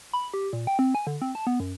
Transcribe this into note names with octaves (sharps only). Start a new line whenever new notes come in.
B5
G4
A#2
G5
C4
G#5
D3
C4
A5
B3
F#2